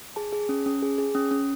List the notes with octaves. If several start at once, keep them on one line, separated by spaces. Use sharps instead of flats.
G#4 A5
G#4
C#4
C#4
G#4
G#4
C#4
C#4